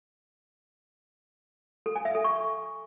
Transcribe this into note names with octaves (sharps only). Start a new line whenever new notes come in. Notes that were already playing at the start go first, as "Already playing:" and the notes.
A4
G#5
E5
A4
C#6